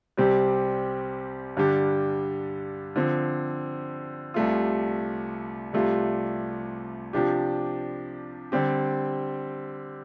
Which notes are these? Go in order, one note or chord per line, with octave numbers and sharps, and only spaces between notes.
C2 C3 G3 C4 G4
G2 D3 G3 D4 G4
D3 F3 C4
C2 C3 A3 F4
C2 C3 A3 F4
C3 F3 D4 G4
D3 G3 C4 G4